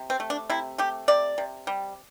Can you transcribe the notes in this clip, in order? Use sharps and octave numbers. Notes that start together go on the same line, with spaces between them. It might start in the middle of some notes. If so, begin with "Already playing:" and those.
Already playing: C3
C4
A3
D4
C3 E4
A3 G4
C3 D5
C3
G3